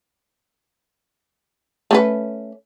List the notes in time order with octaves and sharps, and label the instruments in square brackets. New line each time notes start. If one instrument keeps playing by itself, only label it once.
[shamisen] A3 C#4 B4